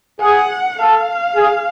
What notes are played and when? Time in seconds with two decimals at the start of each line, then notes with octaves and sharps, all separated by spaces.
0.21 G#4 F#5
0.78 A4 F5
1.36 G#4